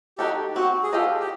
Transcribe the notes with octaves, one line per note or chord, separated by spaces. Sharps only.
D#4 F#4 G4 A4
C4 F#4
G#4
F4 G4 A4 C5 D#5
G4